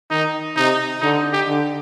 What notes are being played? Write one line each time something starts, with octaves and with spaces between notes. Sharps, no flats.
D#3 D#4
C3 D#4
D3 D#4
G4
D3